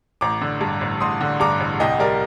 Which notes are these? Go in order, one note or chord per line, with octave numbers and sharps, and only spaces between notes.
A1 A#5 D6
D3
G2
A1
A1 C6 D#6
D3
G2 A#5 D6
A1
C2 D#5 G5
G3 A#4 D5